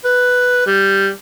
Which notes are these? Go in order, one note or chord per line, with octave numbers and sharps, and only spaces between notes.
B4
G3